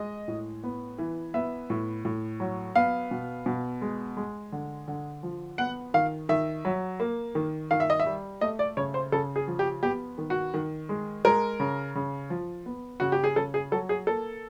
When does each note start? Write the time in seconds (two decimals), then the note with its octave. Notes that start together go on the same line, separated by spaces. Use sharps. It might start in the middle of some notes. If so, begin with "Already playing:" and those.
Already playing: G#3 D#5
0.28 A2
0.64 B3
0.98 E3
1.34 B3 E5
1.70 A2
2.05 A2
2.40 F#3
2.76 B3 F5
3.11 B2
3.46 B2
3.81 G#3
4.17 G#3
4.52 D3
4.88 D3
5.23 F3
5.58 B3 F#5
5.94 D#3 F5
6.29 D#3 E5
6.65 F#3
7.00 A#3
7.35 D#3
7.71 D#3 F5
7.80 E5
7.90 D#5
8.00 E5
8.06 G3
8.41 A3 D#5
8.59 D5
8.77 C#3 C#5
8.94 C5
9.12 C#3 A4
9.36 G#4
9.48 F3
9.59 G4
9.83 B3 G4
10.18 D#3
10.30 F#4
10.54 D#3
10.89 G#3
11.25 G#3 A#4
11.60 C#3
11.95 C#3
12.30 F3
12.66 B3
13.00 C#3 F#4
13.12 G4
13.24 G#4
13.36 C#3 A4
13.54 G#4
13.71 F#3 A4
13.89 G#4
14.07 A#3 A4